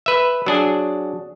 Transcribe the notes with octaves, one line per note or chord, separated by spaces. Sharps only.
B4 E5
F#3 D4 G#4